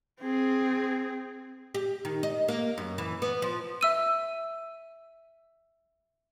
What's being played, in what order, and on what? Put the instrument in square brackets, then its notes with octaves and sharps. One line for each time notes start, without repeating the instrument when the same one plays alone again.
[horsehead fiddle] C4 G#4
[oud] G4
D#3
D#5
A#3
F#2
E3
B3
F3
[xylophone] E5 E6 D#7